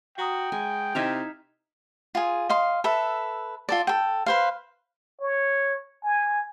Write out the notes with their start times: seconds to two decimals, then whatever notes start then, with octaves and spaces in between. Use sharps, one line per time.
0.18 F#4 F#5 G5 A#5 D#6
0.52 G#3 G#5
0.95 C3 D#4 E4 E5 F5 G#6
2.15 F4 G#4
2.49 D#5 F5 C6
2.84 A4 B4 E5
3.69 F4 A4 D5
3.87 A4 G5
4.26 B4 C5 F5
5.21 C#5
6.03 G#5